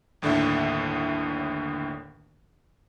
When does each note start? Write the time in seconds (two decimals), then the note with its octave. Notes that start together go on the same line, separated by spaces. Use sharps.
0.22 G1 D#2 A2 D3 D4 E5